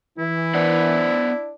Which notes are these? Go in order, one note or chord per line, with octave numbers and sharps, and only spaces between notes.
E3 E4
B3 D4 C5 F#5